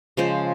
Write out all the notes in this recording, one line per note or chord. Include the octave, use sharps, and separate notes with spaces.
C#3 F3 G#3 C5